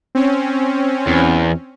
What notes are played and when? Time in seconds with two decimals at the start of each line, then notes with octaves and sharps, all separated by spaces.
0.15 C4 C#4
1.07 E2